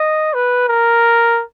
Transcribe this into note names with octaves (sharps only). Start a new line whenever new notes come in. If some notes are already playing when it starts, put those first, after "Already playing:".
Already playing: D#5
B4
A#4